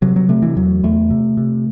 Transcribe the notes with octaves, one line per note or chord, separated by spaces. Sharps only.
C3 F#3
F#3
C3 A3
E3
E2 F#3
E2 A3
C3
C3